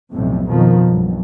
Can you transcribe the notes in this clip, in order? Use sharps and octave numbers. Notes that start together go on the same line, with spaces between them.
B1 F2 A2 C3
F2 B2 D#3 F3
B1 G2